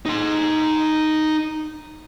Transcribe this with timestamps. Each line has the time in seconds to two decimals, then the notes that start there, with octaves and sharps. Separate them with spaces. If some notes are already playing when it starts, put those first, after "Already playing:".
0.06 D#4 C6